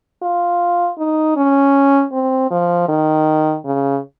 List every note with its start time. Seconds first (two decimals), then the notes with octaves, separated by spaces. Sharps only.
0.22 F4
0.98 D#4
1.36 C#4
2.12 C4
2.51 F3
2.88 D#3
3.65 C#3